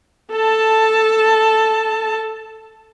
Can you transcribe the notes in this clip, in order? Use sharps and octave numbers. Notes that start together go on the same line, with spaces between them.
A4 A5